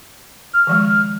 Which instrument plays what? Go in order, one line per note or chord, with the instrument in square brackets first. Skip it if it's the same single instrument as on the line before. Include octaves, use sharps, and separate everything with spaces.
[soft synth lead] F6
[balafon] D#3 F3 G#3